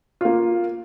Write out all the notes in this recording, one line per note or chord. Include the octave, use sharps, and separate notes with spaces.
A#3 F4